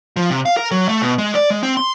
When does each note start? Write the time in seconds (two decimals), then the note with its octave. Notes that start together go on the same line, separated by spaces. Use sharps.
0.16 F3
0.31 C3
0.46 F5
0.57 A#4
0.71 F#3
0.88 A3
1.02 B2
1.18 G#3
1.35 D5
1.50 G#3
1.63 C4
1.77 C6